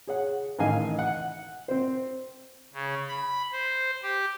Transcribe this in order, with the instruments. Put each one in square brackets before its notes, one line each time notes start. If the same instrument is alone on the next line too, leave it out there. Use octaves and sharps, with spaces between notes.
[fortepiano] G#4 C#5 F#5
A1 D#3 D#5 F5 G#5
F#5
C4 C5
[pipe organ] C#3
B5
C5
G4